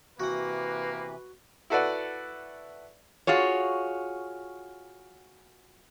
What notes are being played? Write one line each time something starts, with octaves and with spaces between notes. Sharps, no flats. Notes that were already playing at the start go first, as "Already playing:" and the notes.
C3 E3 A#3 F#4 B4 F#5
E4 F#4 A4 B4 D5 F#5
F4 F#4 G#4 C#5